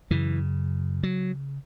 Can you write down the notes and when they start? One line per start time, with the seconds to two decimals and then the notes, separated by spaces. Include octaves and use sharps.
0.11 F#2 C#3 E3
1.03 F#3